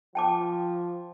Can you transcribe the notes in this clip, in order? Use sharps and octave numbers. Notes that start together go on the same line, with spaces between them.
F3 G5 A5 D6